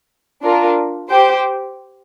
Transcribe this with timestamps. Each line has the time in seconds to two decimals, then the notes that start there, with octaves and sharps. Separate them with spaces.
0.42 D4 F4 A#4
1.10 G4 C5 G5